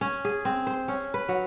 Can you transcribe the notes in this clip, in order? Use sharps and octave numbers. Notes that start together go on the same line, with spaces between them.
C#4
G#4
C4
C5
C#4
B4
F#3